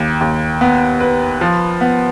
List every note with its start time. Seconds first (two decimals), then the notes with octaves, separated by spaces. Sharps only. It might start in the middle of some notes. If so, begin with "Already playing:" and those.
Already playing: D#2
0.21 D#2
0.61 B3
1.01 B4
1.41 F3
1.81 B3